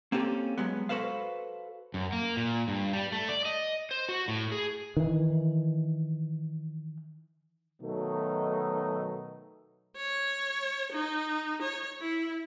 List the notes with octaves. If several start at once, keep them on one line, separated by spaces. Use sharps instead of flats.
A#3 C4 C#4 G4 A4
F#3 G#3 B3
F#4 A4 B4 C5 F5
F#2
A#3
A#2
G2
G3
A3
D5
D#5
C5
F#4
A2
G#4
D#3 E3
B2 D#3 F#3 A3 D#4
C#5
D#4
C#5
E4